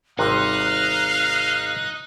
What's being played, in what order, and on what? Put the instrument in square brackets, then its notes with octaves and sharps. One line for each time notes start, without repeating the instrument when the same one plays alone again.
[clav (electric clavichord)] G#1 C3 G3 [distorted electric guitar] D#4 [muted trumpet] F5 [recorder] F#6